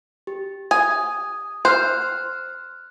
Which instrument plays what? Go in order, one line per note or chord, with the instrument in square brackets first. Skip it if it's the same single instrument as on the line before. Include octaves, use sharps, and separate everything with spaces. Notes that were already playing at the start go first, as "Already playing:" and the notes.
[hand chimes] G4
[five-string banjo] G#5 [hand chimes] D#6
[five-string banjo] C5 [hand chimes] F6 F#6